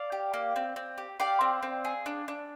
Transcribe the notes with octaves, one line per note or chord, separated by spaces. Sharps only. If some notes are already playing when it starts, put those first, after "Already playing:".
Already playing: D5 F5
G4
A#3
C4
C4
G4
G4 D5 F5
C4
C4
G#4
D4
D4